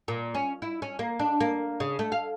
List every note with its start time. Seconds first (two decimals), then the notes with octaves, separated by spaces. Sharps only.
0.08 A#2
0.35 C#4
0.62 E4
0.82 C#4
0.99 A#3
1.19 D4
1.40 A#3
1.80 C#3
1.99 A3
2.12 F5